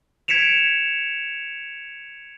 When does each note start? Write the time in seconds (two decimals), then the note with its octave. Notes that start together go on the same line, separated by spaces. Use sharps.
0.28 G#6 B6 C#7 D7 E7 F7